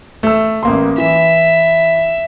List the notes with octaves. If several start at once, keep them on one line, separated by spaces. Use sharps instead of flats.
A3 E6
A1 A#3 C6
E3 E5